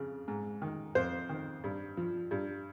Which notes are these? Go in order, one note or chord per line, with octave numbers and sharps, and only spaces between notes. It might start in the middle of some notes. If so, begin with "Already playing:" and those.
Already playing: F2 C#3
G#2
D#3
F2 C5
D#3
G2
F3
G2